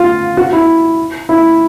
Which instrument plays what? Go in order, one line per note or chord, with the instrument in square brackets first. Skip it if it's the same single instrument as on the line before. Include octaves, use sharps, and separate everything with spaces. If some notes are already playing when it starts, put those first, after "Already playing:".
Already playing: [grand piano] F4
F#4
E4
E4